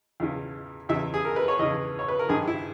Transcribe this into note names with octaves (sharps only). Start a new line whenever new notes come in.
E2 C#3 E3
E2 C#3 E3 E5
G#4
A#4
B4
C#5
E2 C#3 E3 D#5
C#5
B4
A#4
G#1 G2 D#3 G#4
E4